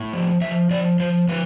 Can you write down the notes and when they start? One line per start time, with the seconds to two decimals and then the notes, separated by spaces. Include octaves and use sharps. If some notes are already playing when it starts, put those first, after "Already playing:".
Already playing: A2
0.13 F3
0.41 F3 E5
0.70 F3 D5
0.99 F3 C5
1.28 F3 B4